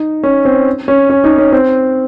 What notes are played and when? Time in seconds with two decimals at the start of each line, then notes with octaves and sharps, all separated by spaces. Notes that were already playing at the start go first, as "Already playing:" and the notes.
Already playing: D#4
0.23 C#4
0.45 C4
0.88 C#4
1.10 C#4
1.24 D#4
1.38 C#4
1.52 C4